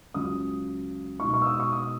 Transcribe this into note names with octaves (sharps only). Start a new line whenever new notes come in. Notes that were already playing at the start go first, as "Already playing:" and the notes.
C#2 C#3 F#3 D#6
B2 G#3 D#4 C#6
C#6
E6
D#6
C#6
D#6